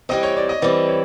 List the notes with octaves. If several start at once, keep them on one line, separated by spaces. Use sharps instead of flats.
E3 G3 C4 D#5
C#5
D5
D#5
E3 G3 C4 D5
C#5